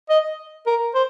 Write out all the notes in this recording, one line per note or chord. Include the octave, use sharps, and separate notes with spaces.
D#5
A#4
C5